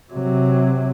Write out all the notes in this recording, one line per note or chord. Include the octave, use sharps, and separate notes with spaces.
C3 F#3